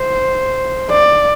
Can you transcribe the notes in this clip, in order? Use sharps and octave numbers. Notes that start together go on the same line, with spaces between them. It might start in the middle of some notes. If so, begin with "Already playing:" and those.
Already playing: C5
D5